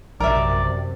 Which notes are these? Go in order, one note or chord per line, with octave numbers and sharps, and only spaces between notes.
A#1 F#2 C3 A#4 D5 E5